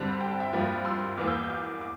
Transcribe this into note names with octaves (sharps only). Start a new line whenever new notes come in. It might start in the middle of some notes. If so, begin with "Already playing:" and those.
Already playing: G2 D3 G3 C4 A4
G5
A5
E5 G5
G2 F3 A#3
C6 E6
E2 E3 A#3 D6 F6
E6 G6
E6 G6
D6 F6
D6